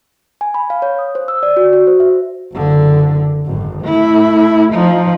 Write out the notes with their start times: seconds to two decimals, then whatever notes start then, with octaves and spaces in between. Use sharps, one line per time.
0.41 G#5
0.54 B5
0.70 F5
0.82 C#5
0.99 D#6
1.15 C5
1.28 E6
1.43 D5
1.57 F#4
1.73 F#4
1.87 C5
2.00 E5
2.52 F#1 D3
3.46 G#1 F#2
3.82 A3 E4
4.73 F3 D#4